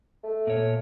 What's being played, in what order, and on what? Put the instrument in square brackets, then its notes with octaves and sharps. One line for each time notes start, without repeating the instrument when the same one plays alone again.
[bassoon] A3
[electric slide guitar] A#2 C#5